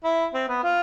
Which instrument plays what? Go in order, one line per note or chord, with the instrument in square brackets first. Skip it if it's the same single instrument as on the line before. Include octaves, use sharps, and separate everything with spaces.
[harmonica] E4
C4
B3
F4